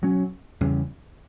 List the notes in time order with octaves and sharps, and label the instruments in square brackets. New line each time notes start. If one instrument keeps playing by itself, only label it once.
[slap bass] B2 F#3 C#4
E2 C#3 G3 C#4